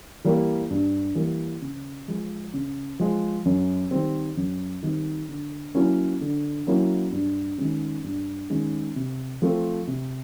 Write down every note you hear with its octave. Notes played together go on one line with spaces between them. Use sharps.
E3 G3 A#3
G2
E3 G3 A#3
C#3
F3 G#3
C#3
F3 G#3
F#2
D#3 G3 C4
F#2
D#3 G3 C4
D3
F#3 A#3 C#4 E4
D3
F#3 A#3 C#4 E4
G2
D#3 G#3 C#4
G2
D#3 G#3 C#4
C3
F3 A3 C4
C3